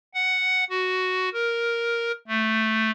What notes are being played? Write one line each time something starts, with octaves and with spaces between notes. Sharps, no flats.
F#5
F#4
A#4
A3